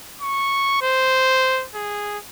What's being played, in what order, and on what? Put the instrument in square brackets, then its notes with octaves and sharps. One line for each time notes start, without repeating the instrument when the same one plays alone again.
[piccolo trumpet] C#6
C5
G#4